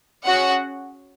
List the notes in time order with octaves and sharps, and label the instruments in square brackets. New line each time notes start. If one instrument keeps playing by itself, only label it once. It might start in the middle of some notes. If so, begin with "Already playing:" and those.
[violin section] C#4 F#4 G#4 F#5